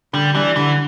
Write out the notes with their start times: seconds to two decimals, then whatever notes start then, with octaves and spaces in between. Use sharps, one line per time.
0.13 D3 G3
0.35 E3 G3 D4
0.56 D3 E3